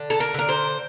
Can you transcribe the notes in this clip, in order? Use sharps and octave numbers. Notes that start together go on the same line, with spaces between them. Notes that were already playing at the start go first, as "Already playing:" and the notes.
Already playing: D3
A4
A#4
D3 A#4
C5